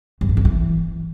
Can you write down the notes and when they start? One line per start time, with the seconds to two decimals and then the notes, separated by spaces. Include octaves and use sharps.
0.21 G2
0.29 G#2
0.37 F#2
0.45 E3